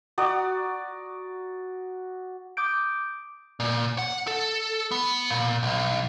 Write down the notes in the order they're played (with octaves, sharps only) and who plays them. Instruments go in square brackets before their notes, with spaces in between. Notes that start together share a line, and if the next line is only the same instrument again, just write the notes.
[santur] F#4 D5 A#5 D#6
[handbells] D6 D#6 G6 D7
[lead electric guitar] A#2
F#5
A4
B3
A#2
B1